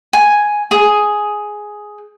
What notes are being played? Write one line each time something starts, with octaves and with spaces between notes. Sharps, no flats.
G#5
G#4 D#6